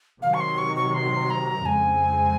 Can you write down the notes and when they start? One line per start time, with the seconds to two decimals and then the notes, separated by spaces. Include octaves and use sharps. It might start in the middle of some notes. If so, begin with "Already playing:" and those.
0.22 C3 D#3 F#3 F5
0.34 C#6
0.40 C6
0.58 C#6
0.76 C#6
0.94 C6
1.30 A#5
1.65 F2 C#3 G#3 C4 G#5